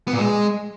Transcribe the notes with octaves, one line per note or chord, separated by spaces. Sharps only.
B3
A#2
G#3